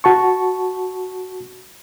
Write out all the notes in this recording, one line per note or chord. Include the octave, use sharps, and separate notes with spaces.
F#4 A5 C#6